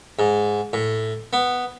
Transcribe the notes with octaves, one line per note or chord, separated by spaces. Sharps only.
G#2
A2
B3